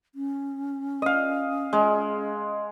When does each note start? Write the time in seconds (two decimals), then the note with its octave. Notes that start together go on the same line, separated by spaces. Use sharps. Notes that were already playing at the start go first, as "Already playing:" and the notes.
0.15 C#4
1.02 D#5 F5
1.73 G#3